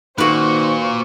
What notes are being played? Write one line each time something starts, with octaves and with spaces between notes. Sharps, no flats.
A#2 D#3 A#3 F#4 B4 C5 C#6